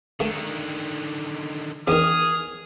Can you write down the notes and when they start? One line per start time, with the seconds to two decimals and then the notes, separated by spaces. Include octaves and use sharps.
0.20 D3 D#3 A3
1.88 E2 D#3 G#4 D#6 F6